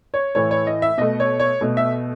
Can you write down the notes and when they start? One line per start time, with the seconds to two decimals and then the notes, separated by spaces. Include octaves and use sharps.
0.14 C#5
0.35 A2 E3 A3 C#5
0.51 C#5
0.67 D#5
0.82 E5
0.98 B2 A3 D#5
1.20 C#5
1.40 C#5
1.61 B2 A3
1.77 E5